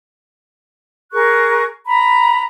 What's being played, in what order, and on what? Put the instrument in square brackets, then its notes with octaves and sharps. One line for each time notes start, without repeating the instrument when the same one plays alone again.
[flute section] G#4 A#4 C#6 F#6
A#5 B5